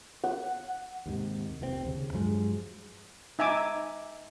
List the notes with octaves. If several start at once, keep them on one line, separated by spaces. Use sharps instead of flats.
F#5
D#2 G#2 C3
F1 C2 G#2 C4
D#2 C#3
G2 F3 F#3 G#3
D#4 E5 G#5 D6